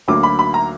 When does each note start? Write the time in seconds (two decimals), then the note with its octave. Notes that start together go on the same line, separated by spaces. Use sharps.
0.08 D2 D3 F#3 A#3 D6
0.23 B5
0.39 B5
0.54 A#5